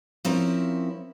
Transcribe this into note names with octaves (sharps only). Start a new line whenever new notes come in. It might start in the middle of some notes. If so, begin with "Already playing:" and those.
F3 C4 C#4 E4 A#4